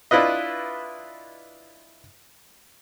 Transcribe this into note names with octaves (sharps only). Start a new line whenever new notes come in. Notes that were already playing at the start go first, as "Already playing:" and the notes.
D4 E4 F4 B4 D#5